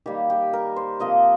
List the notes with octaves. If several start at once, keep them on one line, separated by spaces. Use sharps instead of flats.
D#3 G3 A#3 G4
G4
A#4
C5
C3 F3 A#3 D#5